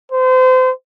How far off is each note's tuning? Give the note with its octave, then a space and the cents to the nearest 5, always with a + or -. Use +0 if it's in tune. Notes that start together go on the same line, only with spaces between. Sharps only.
C5 -30